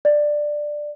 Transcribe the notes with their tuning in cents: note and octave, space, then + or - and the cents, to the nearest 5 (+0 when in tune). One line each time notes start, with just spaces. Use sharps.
D5 +10